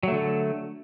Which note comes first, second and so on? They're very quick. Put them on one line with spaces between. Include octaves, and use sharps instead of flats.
F#3 A3 D3